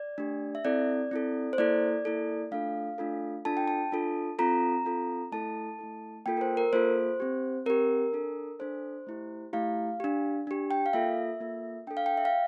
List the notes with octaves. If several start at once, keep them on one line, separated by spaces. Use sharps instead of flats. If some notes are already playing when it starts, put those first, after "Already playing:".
Already playing: D5
A3 D4 G4
E5
C4 E4 A4 D5
C4 E4 A4
C5
A#3 E4 A4 D5
A#3 E4 A4
A3 D4 F4 A4 F5
A3 D4 F4 A4
D4 F4 A4 A5
G5
A5
D4 F4 A4
C4 F4 A4 A#5
C4 F4 A4
A3 E4 A4 A5
A3 E4 A4
A#3 F4 A4 G5
A#4
C5
A#4
A#3 F4 A4 C5
C4 G4
C4 G4 A#4
D4 A4
D4 A4 C5
A3 E4 G4
A3 E4 G4 F5
D4 G4
D4 G4
G5
F5
A#3 F4 A4 E5
A#3 F4 A4
D4 A4 G5
F5
G5
E5
F5